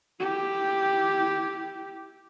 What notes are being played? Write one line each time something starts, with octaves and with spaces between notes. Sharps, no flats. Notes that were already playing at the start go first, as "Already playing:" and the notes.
E4 G4